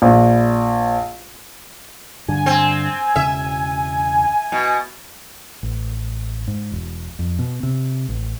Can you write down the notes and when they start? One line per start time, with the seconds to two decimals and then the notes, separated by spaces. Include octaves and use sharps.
0.02 A#1
2.28 G2 D3 G#5
2.46 C4
3.16 E1 C#3 C#4 E5
4.52 B2
5.63 A1
6.47 G#2
6.72 E1
7.19 F2
7.39 B2
7.63 C3
8.08 A1